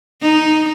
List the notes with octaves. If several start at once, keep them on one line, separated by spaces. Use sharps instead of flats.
D#4